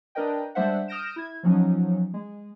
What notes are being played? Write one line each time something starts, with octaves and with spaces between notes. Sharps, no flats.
D4 A#4 B4 D#5 G5
G3 G#3 D4 C5 E5 F#5
D#6 F6 G6 A#6 D7 E7
E4 G#6
F3 F#3 C#4 D#4
G#3